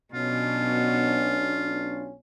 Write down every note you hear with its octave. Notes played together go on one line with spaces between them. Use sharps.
B1 B2 C#4 D4 F4